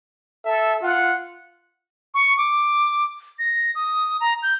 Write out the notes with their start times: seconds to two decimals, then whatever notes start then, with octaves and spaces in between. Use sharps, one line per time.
0.46 A4 E5
0.83 F4 F#5
2.14 C#6
2.38 D6
3.39 A#6
3.75 D#6
4.20 A#5
4.43 G6